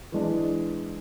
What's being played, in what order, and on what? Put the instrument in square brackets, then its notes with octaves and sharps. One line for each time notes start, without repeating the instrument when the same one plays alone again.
[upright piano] E3 G#3 D4